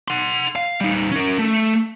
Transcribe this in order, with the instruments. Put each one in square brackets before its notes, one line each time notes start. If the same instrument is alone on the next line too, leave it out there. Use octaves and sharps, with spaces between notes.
[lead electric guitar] F#5 C6
F5
G3 D#4
C#4 A#4
A3